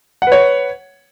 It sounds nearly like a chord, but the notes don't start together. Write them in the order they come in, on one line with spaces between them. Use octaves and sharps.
F#5 B4 C#5